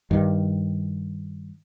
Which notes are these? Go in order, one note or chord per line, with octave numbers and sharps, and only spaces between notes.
G2 D#3